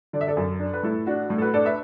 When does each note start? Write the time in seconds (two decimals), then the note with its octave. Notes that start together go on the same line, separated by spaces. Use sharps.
0.13 D3 D5
0.21 E5
0.27 A4 D5
0.37 F#2
0.60 D4
0.74 B4
0.83 A2 E4 A4
1.07 D4 F#4
1.30 A2
1.38 A4
1.42 F#4 B4
1.54 D4 A4 D5
1.65 B4 E5